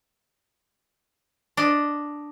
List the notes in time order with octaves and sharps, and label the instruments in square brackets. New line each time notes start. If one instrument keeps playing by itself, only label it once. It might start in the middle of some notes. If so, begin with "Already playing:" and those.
[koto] D4 D#5